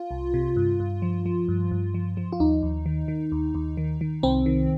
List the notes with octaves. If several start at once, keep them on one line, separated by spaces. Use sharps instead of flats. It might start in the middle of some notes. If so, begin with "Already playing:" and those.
Already playing: F4
C2
C3
G2
G2
F3
F3
G2
G2
F3
F3
F4
D#2 D#4
D#2
D#3
D#3
D#2
D#2
D#3
D#3
C2 C4
D#3